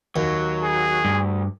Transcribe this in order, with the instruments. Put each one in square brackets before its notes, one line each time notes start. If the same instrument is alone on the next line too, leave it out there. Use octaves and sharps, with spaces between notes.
[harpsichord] D#2 [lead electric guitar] F#3
[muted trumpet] G#4
[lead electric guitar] D2 [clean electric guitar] G2